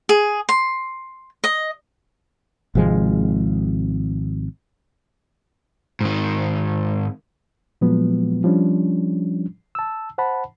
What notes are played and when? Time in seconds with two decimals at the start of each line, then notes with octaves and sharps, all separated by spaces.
0.09 G#4
0.49 C6
1.44 D#5
2.75 G#1 C3 F3 G#3
6.01 G#2 D#3
7.81 A#2 F3 F#3 G#3 B3
8.44 F3 G3 C#4 D4
9.75 A5 E6
10.18 C5 F#5 A5 B5